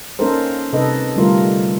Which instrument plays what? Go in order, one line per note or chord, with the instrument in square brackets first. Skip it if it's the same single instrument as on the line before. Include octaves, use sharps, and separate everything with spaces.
[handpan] A#3 C#4 D#4 A4 A#4 C5
C3 D#4 A4 B4 D#5
D3 G3 A3 F4 A4 A#4